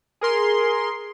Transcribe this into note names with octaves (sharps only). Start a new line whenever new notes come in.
G#4 A#4 C6